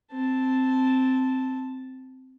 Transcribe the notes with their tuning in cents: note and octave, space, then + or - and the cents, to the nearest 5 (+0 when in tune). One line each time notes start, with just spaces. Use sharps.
C4 -5 A5 +0